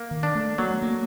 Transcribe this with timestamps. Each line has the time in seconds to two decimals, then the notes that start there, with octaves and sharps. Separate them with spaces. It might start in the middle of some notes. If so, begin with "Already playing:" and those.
Already playing: A#3
0.11 D#3
0.23 D4
0.35 A3
0.58 F#3 A#3
0.71 A3
0.82 A#3